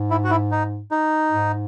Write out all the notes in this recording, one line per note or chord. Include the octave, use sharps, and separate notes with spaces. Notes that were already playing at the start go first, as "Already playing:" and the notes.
Already playing: G#2
E4
F#4
E4
D#4
D#4
G#2